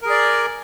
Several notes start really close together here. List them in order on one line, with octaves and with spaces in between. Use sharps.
A#4 G#4 D5